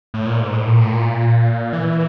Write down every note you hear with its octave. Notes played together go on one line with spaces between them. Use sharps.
A2
A#2
G#2
A2
A#2
A2
A#2
E3